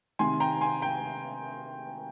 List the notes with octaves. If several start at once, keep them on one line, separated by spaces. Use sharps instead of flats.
C3 D#3 G#5 C6
G5 A#5
G#5 C6
G5 A#5